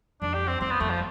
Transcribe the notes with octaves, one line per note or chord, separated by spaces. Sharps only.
F2 D4
G4
C4
F2 C4
B3
F2 A3
F3